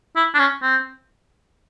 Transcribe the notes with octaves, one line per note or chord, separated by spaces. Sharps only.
E4
D4
C#4
C4